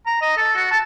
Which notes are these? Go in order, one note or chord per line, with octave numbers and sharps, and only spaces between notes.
A#5
D#5
A4
F#4
A5